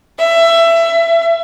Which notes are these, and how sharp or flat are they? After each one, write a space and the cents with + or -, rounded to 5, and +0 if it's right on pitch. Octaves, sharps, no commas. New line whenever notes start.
E5 +20
E5 +35